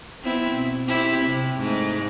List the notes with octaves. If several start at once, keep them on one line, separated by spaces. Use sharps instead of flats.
B3 C4 E4
B2
C4 E4 G4
C3
G#2 G#3 A3